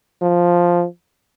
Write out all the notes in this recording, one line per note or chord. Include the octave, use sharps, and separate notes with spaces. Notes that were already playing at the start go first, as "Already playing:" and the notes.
F3